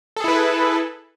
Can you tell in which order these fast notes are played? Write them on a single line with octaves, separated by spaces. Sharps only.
A4 G#4 E4 B4